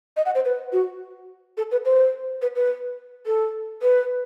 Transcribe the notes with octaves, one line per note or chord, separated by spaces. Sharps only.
D#5
F#5
C5
B4
F#4
A4
B4
C5
B4
B4
A4
B4